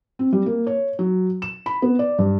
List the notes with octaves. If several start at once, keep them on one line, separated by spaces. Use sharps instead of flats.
C4
G3
A#3
C#5
F#3
E7
B5
B3
D5
G2